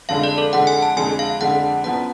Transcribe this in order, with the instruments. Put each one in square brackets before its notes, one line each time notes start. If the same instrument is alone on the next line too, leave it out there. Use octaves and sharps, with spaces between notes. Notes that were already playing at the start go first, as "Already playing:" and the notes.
[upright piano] F2 D3 G#3 [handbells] F5
[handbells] D5
A4
[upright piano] F2 D3 G#3 [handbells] F#5
[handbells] G#5
A5
[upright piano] F2 D3 G#3 [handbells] G#5
[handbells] F5
[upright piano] F2 D3 G#3 [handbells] F#5
[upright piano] F#2 F3 B3 [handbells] F#5